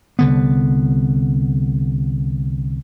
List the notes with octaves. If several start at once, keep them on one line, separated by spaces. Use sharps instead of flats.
C2 D3 B3